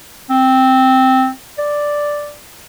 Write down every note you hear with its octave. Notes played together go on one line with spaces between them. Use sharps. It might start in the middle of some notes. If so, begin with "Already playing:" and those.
C4
D5